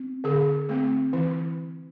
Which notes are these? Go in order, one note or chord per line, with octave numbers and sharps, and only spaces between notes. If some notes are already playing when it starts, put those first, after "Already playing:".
Already playing: C4
D3 G#4
A3 C4
E3 E4